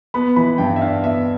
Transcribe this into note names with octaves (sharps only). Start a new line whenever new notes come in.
B3 B5
E3 B5
G2 G5
E5
D4 F5
B3 E5